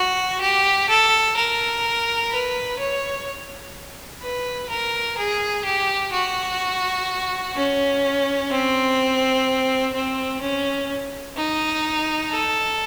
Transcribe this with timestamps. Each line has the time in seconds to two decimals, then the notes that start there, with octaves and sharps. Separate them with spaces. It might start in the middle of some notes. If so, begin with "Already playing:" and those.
Already playing: F#4
0.41 G4
0.89 A4
1.36 A#4
2.31 B4
2.79 C#5
4.22 B4
4.69 A#4
5.17 G#4
5.65 G4
6.13 F#4
7.56 C#4
8.51 C4
9.93 C4
10.41 C#4
11.37 D#4
12.32 A4